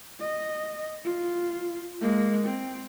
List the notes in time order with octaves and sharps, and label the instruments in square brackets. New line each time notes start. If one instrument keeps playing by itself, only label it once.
[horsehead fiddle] D#5
F4
G#3 A#3
C4